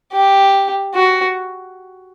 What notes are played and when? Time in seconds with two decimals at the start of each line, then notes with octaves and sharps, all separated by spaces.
0.13 G4
0.95 F#4